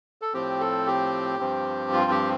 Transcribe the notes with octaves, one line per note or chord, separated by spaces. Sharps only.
A4
A2 F3 C4 G4
A4
G4
G2 F3 C4
F4
G4